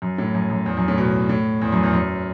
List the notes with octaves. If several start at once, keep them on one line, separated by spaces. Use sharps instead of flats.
F#2
A2
F#2
F#2
E2
F#2
A2
B2
A2
E2
F#2
E2
F#2